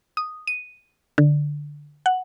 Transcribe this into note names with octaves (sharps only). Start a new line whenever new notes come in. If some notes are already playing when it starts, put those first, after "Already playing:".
D#6
D#7
D3
F#5